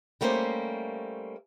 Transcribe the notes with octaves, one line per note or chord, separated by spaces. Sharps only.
G3 A3 A#3 C#4 C5